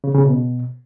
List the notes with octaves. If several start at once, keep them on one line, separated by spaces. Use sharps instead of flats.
C#3
C#3
B2